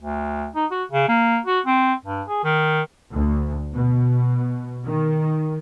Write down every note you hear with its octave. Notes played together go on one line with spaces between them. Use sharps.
D2
D#4
F#4
C#3
A#3
F#4
C4
G2
G#4
D#3
D2
B2
D#3